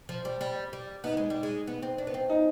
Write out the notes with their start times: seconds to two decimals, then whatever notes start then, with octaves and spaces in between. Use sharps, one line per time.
0.09 F3
0.25 G3
0.41 G3
0.73 G3
1.04 B3 D#4
1.17 G#3
1.30 G3
1.43 G#3
1.67 B3
1.82 C4
1.98 D4
2.07 B3
2.14 C4
2.30 D#4